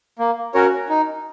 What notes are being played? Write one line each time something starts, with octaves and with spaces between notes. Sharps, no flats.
A#3
C#4 F#4 A#4 C#5
D#4